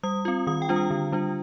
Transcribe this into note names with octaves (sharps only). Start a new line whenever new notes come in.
G3 D#6
C4 F4
D#3 D#6
G5
G3 D4 F4
D#6
D3
G3 D4 F4